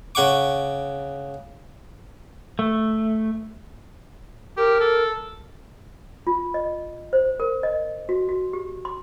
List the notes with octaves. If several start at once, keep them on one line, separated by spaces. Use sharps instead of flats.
C#3 F#5 C#6 D6
A3
G4 A#4
A4
F4
D#5
C5
A#4
D#5
F#4
F#4
G4
C6